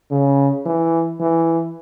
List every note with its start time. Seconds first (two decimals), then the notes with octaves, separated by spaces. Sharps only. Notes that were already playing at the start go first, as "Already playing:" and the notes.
0.11 C#3
0.66 E3
1.20 E3